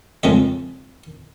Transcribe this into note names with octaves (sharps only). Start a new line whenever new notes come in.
F2 C#3 G#3 E5